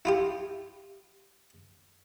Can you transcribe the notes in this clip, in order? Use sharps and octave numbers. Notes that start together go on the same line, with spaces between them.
E4 F4 G4